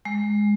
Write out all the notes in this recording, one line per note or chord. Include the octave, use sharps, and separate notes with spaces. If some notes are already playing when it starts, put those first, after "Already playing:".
G#3